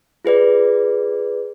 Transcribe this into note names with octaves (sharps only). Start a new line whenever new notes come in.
F4 G#4 B4 D5